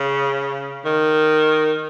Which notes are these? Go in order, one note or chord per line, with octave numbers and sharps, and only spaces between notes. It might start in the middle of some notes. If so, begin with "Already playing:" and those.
Already playing: C#3
D#3